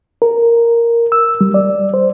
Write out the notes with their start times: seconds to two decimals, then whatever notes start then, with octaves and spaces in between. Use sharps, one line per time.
0.22 A#4
1.12 E6
1.41 G3
1.54 D5
1.94 C5